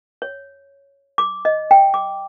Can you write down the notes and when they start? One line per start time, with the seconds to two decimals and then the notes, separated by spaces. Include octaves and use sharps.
0.22 C#5
1.18 D6
1.45 D#5
1.71 G5
1.94 D6